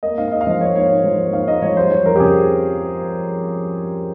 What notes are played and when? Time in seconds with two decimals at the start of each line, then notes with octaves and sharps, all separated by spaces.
0.03 A#3 D#5
0.18 G#2 F5
0.32 G#2 D#5
0.41 F5
0.46 F3 D#5
0.61 A#3 C#5
0.75 G#2 C#5
0.90 G#2
1.04 F3
1.18 A#3
1.33 G#2 F5
1.48 G#2 D#5
1.62 F3 C#5
1.77 G3 C5
1.91 F2 C#5
2.06 F2 A#4
2.16 G4
2.20 C#3 G#4